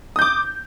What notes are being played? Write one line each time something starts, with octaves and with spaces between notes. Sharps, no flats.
D6 D#6 G6